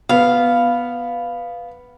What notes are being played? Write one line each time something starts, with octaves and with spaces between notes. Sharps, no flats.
B3 F5